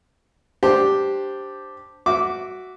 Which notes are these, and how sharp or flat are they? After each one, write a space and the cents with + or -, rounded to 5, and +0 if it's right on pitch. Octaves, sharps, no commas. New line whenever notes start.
D4 +0 G4 +0 C5 +0
F#4 +0 E5 +0 D6 -15